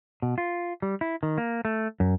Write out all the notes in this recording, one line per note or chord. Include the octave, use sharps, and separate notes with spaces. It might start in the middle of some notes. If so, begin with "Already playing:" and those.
B2
F4
G3
E4
D#3
A#3
A3
F#2